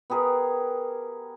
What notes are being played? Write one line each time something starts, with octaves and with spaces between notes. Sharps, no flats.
B3 G4 G#4 A#4